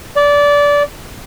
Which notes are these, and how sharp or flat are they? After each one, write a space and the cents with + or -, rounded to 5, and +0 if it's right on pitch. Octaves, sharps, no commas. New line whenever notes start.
D5 -20